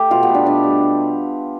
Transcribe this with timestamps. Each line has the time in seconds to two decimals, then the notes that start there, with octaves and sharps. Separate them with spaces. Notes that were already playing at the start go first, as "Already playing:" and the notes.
Already playing: A3 G4
0.10 B2 F4
0.23 B3
0.29 A3
0.35 D4
0.45 B2 D4
0.63 G3